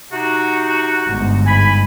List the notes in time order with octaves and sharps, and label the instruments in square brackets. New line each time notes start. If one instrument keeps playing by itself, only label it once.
[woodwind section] C3 D#4 F#4
[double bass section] G1 G#2
[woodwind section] G#5 B5